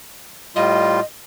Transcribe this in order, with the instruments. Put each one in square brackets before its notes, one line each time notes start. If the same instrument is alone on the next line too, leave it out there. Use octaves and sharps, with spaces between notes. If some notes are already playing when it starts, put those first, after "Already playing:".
[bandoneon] A2 G3 F4 [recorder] D#5